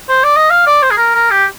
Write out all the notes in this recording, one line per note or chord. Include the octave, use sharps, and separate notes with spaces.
C5
D5
D#5
F5
D5
C5
G#4
A#4
A#4
G4